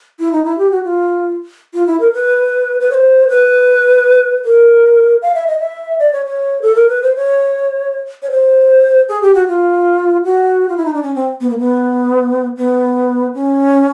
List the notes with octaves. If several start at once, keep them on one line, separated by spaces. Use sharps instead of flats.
E4
D#4
E4
G4
F#4
F4
F4
E4
A#4
B4
B4
C#5
C5
B4
A#4
F5
E5
D#5
E5
D5
C#5
C#5
A4
A#4
B4
C5
C#5
C#5
C5
G#4
G4
F#4
F4
F#4
F4
E4
D#4
D4
C#4
C4
B3
A#3
B3
B3
C#4